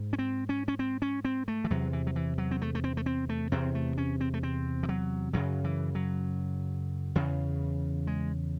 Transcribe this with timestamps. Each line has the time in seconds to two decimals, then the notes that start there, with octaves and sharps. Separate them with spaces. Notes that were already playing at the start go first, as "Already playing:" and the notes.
Already playing: G#2
0.13 C#4
0.19 C4
0.49 C#4
0.68 C#4
0.79 C4
1.02 C#4
1.25 C4
1.48 A3
1.64 E3
1.70 E2 C3 F#3
1.93 E3
2.07 F#3
2.16 E3
2.38 F#3
2.51 C4
2.62 A3
2.75 A3
2.84 C4
2.97 A3
3.06 C4
3.29 A3
3.52 E2 C3 C4
3.75 A3
3.98 C#4
4.21 C4
4.34 A3
4.43 C4
4.83 E3
4.89 F#3
5.33 F#2 C#3 F#3
5.64 E3
5.95 F#3
7.15 E2 C#3
8.07 G#3